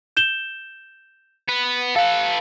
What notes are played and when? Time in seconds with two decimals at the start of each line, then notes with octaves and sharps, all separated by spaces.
0.17 G6 E7 G7
1.48 B3 B4
1.96 A4 B4 F5